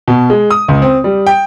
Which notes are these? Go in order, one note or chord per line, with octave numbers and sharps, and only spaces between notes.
B2
G#3
D#6
C#2
C4
G3
G5